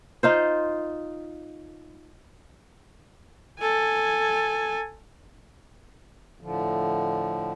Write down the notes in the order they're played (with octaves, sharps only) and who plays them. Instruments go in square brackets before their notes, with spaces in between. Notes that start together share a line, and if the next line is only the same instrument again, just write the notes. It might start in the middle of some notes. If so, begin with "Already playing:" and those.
[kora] D#4 F4 C5
[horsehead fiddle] A4 G#5
[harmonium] A2 D3 F3